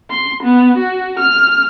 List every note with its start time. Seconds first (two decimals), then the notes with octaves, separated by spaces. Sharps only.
0.11 C6
0.43 B3
0.77 F#4
1.19 F6